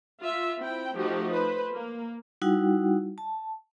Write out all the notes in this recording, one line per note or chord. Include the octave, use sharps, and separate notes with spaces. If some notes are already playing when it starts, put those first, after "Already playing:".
F4 E5
C4 E4 G5
F3 A3 D#4 F#4 G4
B4 C5
A#3
G3 D#4 E4 F#4 F#5 G5
A5